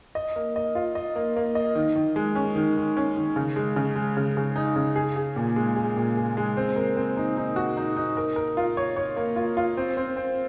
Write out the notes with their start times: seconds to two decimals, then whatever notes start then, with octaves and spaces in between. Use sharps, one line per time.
0.15 D#5
0.36 A#3
0.56 D#5
0.75 F4
0.95 D#5
1.16 A#3
1.37 A#3
1.55 D#5
1.75 D#3
1.96 D#3
2.16 G#3
2.35 C#4
2.56 D#3
2.77 D#3
2.97 C#4
3.16 D#3
3.36 C#3
3.56 G#3
3.76 C#3
3.96 G#3
4.17 C#3
4.37 C#3
4.56 D#4
4.76 C#3
4.96 G#4
5.16 G#4
5.36 A#2
5.56 G#3
5.76 G#4
5.96 A#2
6.17 G#4
6.37 G#3
6.57 C4
6.76 A#4
6.96 C4
7.17 D#4
7.37 D#4
7.56 F#4
7.77 D#4
7.96 D#4
8.17 A#4
8.36 A#4
8.57 F4
8.77 C#5
8.96 C#5
9.16 A#3
9.36 F4
9.57 F4
9.77 C4
9.97 C4
10.17 C4